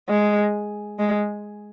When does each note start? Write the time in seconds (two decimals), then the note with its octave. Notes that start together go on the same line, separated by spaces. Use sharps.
0.09 G#3
0.99 G#3